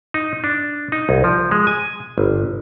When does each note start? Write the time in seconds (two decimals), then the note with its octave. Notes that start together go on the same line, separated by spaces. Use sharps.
0.14 D#4
0.44 D4
0.92 D#4
1.09 C2
1.24 F3
1.51 G#3
1.67 G#5
2.18 G1